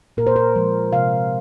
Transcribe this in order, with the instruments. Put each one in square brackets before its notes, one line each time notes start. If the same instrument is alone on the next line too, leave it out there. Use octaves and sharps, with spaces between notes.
[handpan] A#2 A#4
C5
A#4
F3 G#3
C3 F5